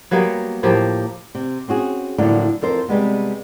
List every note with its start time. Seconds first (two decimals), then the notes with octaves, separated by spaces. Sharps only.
0.11 F#3 G3 A#3 B3
0.63 A2 F3 A#3 G4
1.35 C3
1.68 C4 C#4 F#4 G#4
2.18 A2 D3 F3 F#3 A#3 D4
2.62 F2 A4 A#4 C5
2.88 C3 G3 G#3 B3